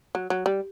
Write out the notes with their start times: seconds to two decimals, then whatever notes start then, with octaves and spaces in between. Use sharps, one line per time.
0.15 F#3
0.30 F#3
0.46 G3